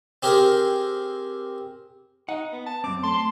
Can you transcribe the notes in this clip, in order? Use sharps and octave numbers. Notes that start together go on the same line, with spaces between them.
C4 G4 G#4 A#4
D#4 F#5
B3
A5
F#2 C4 D6
A3 A5 C6